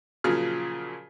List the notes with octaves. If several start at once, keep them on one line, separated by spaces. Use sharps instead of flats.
A#2 C#3 F3 F#3 G#4 F6